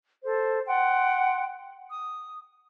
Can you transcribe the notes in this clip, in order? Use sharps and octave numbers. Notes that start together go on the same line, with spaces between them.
A4 C5
F#5 G5 C6
D#6